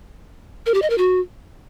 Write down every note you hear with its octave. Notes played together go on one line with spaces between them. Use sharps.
A#4
G4
D#5
A#4
F#4